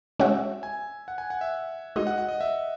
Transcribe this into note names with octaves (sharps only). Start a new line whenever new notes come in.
G#3 C#4 F#4 E5
G#5
F#5
G#5
F#5
E5
G#3 D#4 F#4 D#5
F#5
F#5
D#5
E5